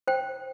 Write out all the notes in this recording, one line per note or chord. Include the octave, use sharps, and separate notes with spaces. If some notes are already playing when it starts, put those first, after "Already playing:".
C5 G5